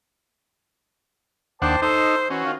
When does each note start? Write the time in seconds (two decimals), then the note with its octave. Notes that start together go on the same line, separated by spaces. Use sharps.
1.62 D#2 D4 C5 F#5 G5 A5 D6
1.82 D#4 A4 C5 D#5
2.30 E3 C#4 F#4
2.45 D#3 F4 F5